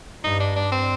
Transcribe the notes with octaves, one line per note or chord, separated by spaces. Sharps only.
G2 D#4
D4
D4
C4